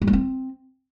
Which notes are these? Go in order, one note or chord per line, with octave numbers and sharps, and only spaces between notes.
G3
A#3
C4